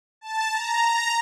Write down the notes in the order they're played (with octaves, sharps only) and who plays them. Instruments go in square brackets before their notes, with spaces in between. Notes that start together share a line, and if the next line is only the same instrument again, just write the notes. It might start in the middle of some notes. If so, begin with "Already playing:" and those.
[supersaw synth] A5
A#5
A#5